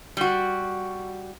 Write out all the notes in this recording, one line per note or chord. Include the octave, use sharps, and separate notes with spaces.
G3 F#4